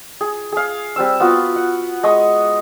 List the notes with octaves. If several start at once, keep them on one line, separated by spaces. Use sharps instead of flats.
G#4
G#4 F5
G3 C4 E6
B3 F4 F#4
F#5
G#3 D#5 C#6 D#6